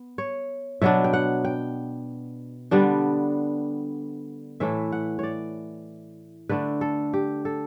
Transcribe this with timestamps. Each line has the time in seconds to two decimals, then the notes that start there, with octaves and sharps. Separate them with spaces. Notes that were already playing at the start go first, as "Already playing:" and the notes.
Already playing: B3
0.18 C#5
0.82 B2 F#3 B3 D4 E5
1.04 G5
1.13 F#5
1.45 G5
2.71 D3 G3 B3 D4
4.60 A2 E3 A3 E4 E5
4.92 F#5
5.19 C#5 D5
6.49 D3 A3 D4 B4
6.81 A4
7.14 G4
7.45 A4